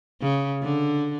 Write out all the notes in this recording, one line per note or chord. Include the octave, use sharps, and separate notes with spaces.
C#3
D3